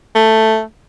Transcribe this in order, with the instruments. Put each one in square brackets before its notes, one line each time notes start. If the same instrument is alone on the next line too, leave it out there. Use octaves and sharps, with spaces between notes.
[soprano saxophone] A3